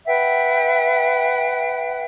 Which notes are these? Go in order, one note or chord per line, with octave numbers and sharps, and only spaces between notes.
B4 E5 F#5 G5